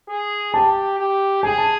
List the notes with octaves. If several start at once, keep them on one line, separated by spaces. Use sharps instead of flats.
G#4
G4 A5
G4
G#4 G#5
A5